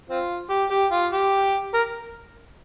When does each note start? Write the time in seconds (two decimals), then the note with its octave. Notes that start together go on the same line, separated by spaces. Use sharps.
0.09 C4 F4
0.50 G4
0.71 G4
0.92 F4
1.12 G4
1.74 A#4